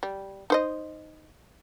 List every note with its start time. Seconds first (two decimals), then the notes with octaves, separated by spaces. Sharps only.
0.03 G3
0.50 D#4 C5 D#5